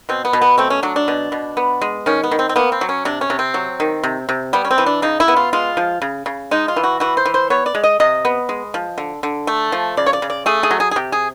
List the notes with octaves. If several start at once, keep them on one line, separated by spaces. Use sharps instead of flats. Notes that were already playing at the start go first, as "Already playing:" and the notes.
B2 C4
B3
B2
B3
A3 C4
C#4
F#3 D4
D4
B2
B2
B3
G#3
D#3 C#4
B3
D#3
C4
C4
A#3 B3
C4
F#3
C#4
C3 D4
C#4
C3
C4
F#3
D#3
C3
C3
G3 B3
C#4
C4
E3
D4
C#3 D#4
E4
B3
F4
G#3 F4
F3
C#3
C#3
G#3 D#4
F4
E3
F#4
E3 F#4
C5
E3
C5
B3 C#5
D5
G#3
D#5
C3 D#5
B3
G#3
F3
D3
D3
A3
F3
C#3 D5
C#5
D5
C#3
D5
A3 G#4
G#4
F#3
G#4
G#4
C3 G4
G#4